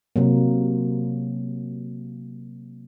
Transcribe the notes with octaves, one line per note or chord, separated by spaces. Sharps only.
C3 F#3 A#3